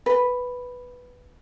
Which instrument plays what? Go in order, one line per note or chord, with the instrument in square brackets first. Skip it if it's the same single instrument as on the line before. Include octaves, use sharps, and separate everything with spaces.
[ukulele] B4